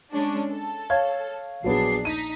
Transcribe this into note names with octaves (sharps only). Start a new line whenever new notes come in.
G#3 C#4 D4
A4
C#5 F5 G#6
A#1 F#3 B3 D4 G#4 C7
D#4 B6 D#7